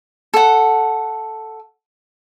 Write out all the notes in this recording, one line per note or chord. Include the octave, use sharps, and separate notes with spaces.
A4 F#5